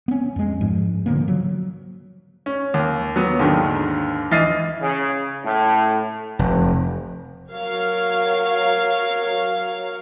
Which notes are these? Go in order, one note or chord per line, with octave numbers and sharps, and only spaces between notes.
B3 C#4
F2 G#3
G#2 F3
D3 E3 F3 A#3
F#3
C#4
D#2
F#3 B3
D#2 G#2 D3 D#3
E3 D#5 F6 A6 C7
C#3
A2
F1
F#3 A#4 C#5 F5